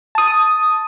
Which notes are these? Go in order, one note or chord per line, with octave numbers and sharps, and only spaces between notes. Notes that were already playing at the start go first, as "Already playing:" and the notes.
A5 D#6